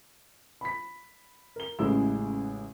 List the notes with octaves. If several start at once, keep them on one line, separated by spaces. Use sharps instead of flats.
B5 B6
A#4 G7
A1 C#3 G#3 E4 E6